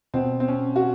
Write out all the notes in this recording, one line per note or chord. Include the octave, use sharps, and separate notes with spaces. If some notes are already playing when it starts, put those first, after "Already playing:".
B2 C4
C4
C#4
F#4